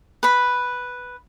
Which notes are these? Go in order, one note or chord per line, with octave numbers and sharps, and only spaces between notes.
B4 B5